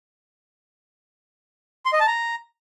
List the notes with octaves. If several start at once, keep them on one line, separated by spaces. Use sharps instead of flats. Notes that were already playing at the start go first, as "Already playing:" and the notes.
C6
D#5
A5
A#5